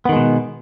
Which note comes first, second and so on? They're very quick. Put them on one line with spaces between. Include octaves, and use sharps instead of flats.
B3 D#3 G#3 B2